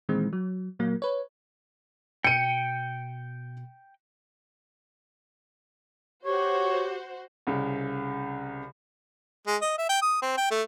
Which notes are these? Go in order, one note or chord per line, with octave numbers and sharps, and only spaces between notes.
A#2 D#3 E3 G#3 C4
F#3
A#2 F#3 A#3
B4 C#5
B2 G5 C#7 D#7
F#4 G4 C5 C#5
C2 C#3
G#3
D#5
E5
G5
D#6
C4
G5
A3